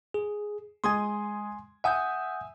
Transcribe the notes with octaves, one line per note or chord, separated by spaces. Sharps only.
G#4
G#3 G#5 C6 D#6 G#6
E5 F#5 G#5 D#6 G6